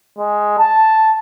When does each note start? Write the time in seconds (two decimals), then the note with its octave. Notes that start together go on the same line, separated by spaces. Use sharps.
0.18 G#3
0.59 A5